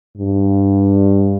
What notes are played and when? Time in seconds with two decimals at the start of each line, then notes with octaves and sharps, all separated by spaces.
0.18 G2